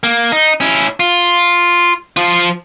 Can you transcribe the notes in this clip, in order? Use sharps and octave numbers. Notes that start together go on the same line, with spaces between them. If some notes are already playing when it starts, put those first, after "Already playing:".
A#3
D#4
C#4 E4
F4
F3 F4